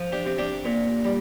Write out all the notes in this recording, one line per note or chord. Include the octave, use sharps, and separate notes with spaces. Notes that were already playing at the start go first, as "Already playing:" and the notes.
Already playing: F3
D4 G4
C3
D4 G4
A#2
G3